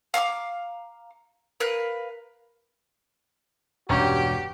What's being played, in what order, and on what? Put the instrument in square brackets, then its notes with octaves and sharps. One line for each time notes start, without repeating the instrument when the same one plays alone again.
[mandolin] F5 A#5 C#6 D6
A#4 B4 F5 F#6
[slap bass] E1 [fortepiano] G2 C#4 A#5 [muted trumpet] F#4 [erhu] G4